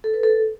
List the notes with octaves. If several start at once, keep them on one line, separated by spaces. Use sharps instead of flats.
A4
B4
A4